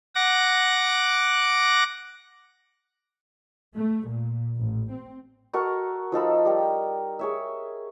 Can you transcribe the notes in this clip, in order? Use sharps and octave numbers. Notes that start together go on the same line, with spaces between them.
F#5 D6 A#6
A3
A#2
A1
C4
F#4 A4 A#4 C#6
F3 D#4 A4 B5
G3 A#4 G5
G#4 C#5 E5